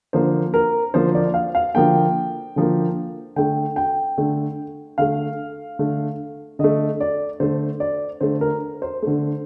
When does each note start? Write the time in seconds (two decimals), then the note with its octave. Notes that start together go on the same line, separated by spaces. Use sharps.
0.13 D3 F3 A#3 C5
0.54 A#4
0.94 D3 F3 A#3 C5
1.15 D5
1.34 F5
1.55 F5
1.75 D3 F3 A#3 G5
2.56 D3 F3 A#3
3.36 D3 A3 G5
3.76 G5
4.18 D3 A3
4.98 D3 A3 F5
5.79 D3 A3
6.59 D3 A3 D#5
7.00 D5
7.40 D3 A3 C5
7.80 D5
8.21 D3 A3 C5
8.41 A#4
8.82 C5
9.02 D3 A3